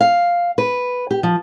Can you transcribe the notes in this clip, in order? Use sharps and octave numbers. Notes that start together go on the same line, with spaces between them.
F5
B4
G4
F3